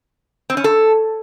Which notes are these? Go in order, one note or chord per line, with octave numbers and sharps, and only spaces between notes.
C4
C#4
A4